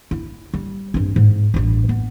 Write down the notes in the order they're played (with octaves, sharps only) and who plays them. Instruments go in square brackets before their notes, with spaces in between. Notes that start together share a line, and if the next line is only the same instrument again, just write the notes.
[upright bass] E4
G3
G2 C4
G#2
A1 G2
B3